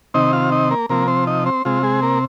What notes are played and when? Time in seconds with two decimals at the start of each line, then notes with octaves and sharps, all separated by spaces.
0.14 C3 D#3 C4 D#4 D#5
0.33 F4 F5
0.52 D#4 D#5
0.71 A#3 A#4
0.89 C3 F3 A#3 C4 A#4
1.08 C4 C5
1.27 D#4 D#5
1.46 C4 C5
1.65 C3 G#3 C4 F4
1.83 G#3 G#4
2.02 A#3 A#4